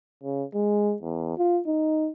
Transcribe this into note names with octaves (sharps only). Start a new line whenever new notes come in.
C#3
G#3
E2
F4
D#4